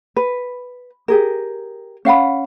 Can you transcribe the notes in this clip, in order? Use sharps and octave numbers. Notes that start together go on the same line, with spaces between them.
B4
G4 G#4 A#4
C#4 F5 F#5 B5